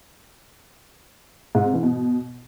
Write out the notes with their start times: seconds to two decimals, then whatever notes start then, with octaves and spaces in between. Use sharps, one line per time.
1.55 G#2
1.64 C3
1.74 E3
1.83 B2